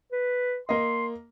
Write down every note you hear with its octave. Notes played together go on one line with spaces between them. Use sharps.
B4
A#3 D#5 C6